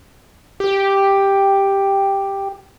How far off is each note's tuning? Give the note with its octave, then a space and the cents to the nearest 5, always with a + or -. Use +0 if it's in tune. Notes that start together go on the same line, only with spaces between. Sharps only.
G4 +5